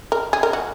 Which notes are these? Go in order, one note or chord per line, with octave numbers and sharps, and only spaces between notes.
A#4
G#4
A#4
F#4